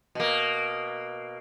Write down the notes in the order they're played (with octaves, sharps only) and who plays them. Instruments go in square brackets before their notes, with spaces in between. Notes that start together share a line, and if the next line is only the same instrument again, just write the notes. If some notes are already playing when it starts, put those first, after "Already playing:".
[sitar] B2 A#3